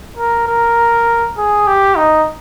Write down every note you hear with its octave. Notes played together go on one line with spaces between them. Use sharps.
A#4
A#4
G#4
G4
D#4